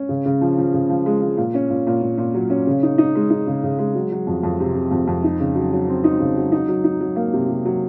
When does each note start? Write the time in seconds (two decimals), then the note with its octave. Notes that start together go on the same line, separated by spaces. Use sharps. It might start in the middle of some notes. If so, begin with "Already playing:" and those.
Already playing: C#4
0.09 C#3
0.25 C#3
0.41 F3
0.58 F3
0.74 C#3
0.90 F3
1.06 G#3
1.21 F3
1.37 A#2
1.54 C#4
1.70 A#2
1.87 A#2
2.02 A#2
2.18 A#2
2.34 F#3
2.50 C#4
2.67 C#3
2.83 D#4
2.98 D#4
3.15 G#3
3.30 D#4
3.47 C#3
3.64 C#3
3.79 G#3
3.95 F#3
4.12 F#3
4.27 F2
4.43 F2
4.60 C3
4.75 C3
4.91 F2
5.08 F2
5.24 D#4
5.40 C#3
5.55 F#3
5.73 F#3
5.89 C4
6.04 D#4
6.20 C#3
6.37 F#3
6.52 D#4
6.68 F#3
6.84 D#4
7.00 F#3
7.16 A#3
7.33 C3
7.49 C3
7.65 F#3